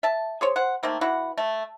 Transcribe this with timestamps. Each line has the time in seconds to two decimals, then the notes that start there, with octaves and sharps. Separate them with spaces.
0.03 E5 A5
0.41 G#4 C5 C#5
0.56 C5 F#5
0.83 D#3 A3 A#3 C4
1.01 E3 E4 F#4 F#5
1.38 A3